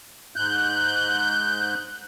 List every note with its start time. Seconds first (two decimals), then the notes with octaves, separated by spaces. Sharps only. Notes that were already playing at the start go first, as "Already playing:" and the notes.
0.36 G#2 F#6 G6